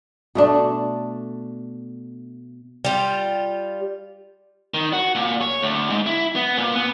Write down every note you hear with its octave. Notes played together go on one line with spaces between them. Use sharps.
B2 A3 D4
G3 F4
D#3
F#4
A#2
C#5
D2
G#2
E4
B3
A#2
B3